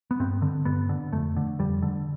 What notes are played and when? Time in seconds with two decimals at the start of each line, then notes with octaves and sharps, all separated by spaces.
0.11 B3
0.20 G2 C4
0.42 D3
0.65 G2 B3
0.89 D3
1.12 F2 A3
1.37 D3
1.59 F2 G3
1.82 D3